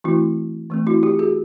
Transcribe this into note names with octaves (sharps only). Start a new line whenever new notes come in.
E3 A3 C4 E4 F#4
E3 A3 C4
E4 F#4
F4 G4
F#4 G#4